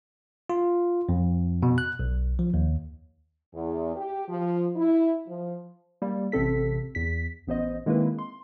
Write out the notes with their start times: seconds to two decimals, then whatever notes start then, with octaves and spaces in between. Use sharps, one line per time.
0.50 F4
1.09 F2
1.63 B2
1.78 F#6
1.99 B1
2.39 F3
2.54 D#2
3.54 E2
3.96 G4
4.28 F3
4.75 E4
5.28 F3
6.02 G3 A#3
6.32 A1 C3 C4 A4 B6
6.95 E2 B6
7.47 A1 B3 C5 D#5
7.86 D#3 G#3 A#3 C4 E4 B4
8.19 C6